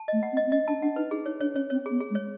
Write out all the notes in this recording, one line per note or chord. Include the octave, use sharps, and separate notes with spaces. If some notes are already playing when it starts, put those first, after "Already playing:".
Already playing: A5
A3 D#5
F#5
C4
D#5
C4
C#4 D#5
D4 A5
D4 F#5
D#4 B4
D#4 G#4
D#4 C#5
D4 C#5
C#4 C#5
C4 C#5
B3 G#4
G#4
G#3
C#5